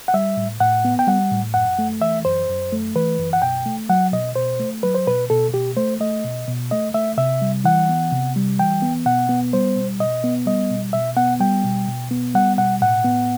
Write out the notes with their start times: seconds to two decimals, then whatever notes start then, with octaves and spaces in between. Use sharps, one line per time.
0.08 F#5
0.14 G3 E5
0.37 A2
0.60 A2 F#5
0.85 B3
0.99 G5
1.07 G3 F#5
1.31 A2
1.54 F#2 F#5
1.79 A3
2.01 E3 E5
2.25 F#2 C5
2.49 F#2
2.72 A3
2.95 E3 B4
3.19 F#2
3.33 F#5
3.42 B2 G5
3.66 A3
3.89 F#3 F#5
4.12 B2 D#5
4.36 B2 C5
4.60 A3
4.83 F#3 B4
4.94 C5
5.07 B2 B4
5.30 B2 A4
5.53 B2 G4
5.76 A3 C5
6.00 A3 D#5
6.24 B2
6.48 B2
6.71 A3 D#5
6.94 A3 E5
7.17 C3 E5
7.41 G3
7.64 E3 F#5
7.89 B3
8.12 C3
8.36 G3
8.59 E3 G5
8.82 B3
9.05 B2 F#5
9.29 B3
9.53 G3 C5
9.76 B2
10.00 B2 D#5
10.24 B3
10.46 G3 D#5
10.70 B2
10.93 B2 E5
11.17 B3 F#5
11.40 G3 G5
11.64 B2
11.88 B2
12.11 B3
12.34 G3 F#5
12.58 B2 F#5
12.81 A2 F#5
13.05 B3